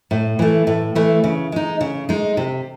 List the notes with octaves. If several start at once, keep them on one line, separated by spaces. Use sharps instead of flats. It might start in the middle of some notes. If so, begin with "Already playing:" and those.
A2
E3 A3
A2
E3 A3
C#3
G#3 D#4
C#3
G#3 D#4
C3